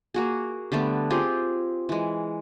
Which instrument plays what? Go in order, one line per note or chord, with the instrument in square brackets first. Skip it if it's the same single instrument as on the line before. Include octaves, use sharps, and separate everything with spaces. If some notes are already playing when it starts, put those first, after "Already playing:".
[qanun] A#3 F#4 G#4
D3 G3 A3 B3
C4 F4 G4 G#4
E3 G#3